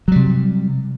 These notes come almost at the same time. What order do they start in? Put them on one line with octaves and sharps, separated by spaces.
F#3 G3 C3